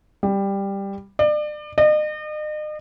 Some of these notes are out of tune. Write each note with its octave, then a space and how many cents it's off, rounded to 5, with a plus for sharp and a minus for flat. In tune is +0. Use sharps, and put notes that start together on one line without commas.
G3 +10
D5 +35
D#5 -40